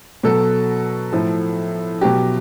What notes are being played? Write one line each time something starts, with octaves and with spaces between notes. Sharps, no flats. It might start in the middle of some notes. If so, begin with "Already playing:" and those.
B2 F#3 A4
A2 F3
B2 F#3 G4